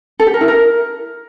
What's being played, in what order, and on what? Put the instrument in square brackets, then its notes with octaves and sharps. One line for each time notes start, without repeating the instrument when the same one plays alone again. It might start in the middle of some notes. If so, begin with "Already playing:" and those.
[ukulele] A4
G4
A#4
E4
A#4